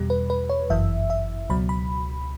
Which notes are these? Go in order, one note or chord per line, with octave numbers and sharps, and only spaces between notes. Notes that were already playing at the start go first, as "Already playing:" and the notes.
Already playing: E2 B2 G3
B4
B4
C#5
G1 F#2 E3 E5
E5
C#2 B2 F#3 B5
B5